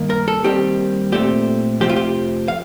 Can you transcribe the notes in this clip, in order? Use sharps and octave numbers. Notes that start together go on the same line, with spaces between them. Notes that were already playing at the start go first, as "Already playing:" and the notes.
Already playing: G2 D#3 A#3
A#4
A4
D#2 D#3 G3 C4 G4
A#2 A3 C4 G4
F2 C3 F3 A3 C4 G4
F4
G4
F5